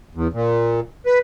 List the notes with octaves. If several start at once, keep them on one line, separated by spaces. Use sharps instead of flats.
E2
A#2
B4